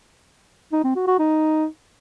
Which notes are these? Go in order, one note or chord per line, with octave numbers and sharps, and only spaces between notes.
D#4
C4
F#4
F#4
D#4